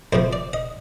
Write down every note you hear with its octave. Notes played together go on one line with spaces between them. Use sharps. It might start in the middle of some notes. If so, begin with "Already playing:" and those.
F2 C3 F3 C5
D5
D#5